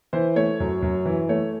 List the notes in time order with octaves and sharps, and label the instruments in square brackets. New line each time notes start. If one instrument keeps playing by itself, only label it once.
[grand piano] E3 C5
A3 C#5
F#2
F#2
E3
A3 C#5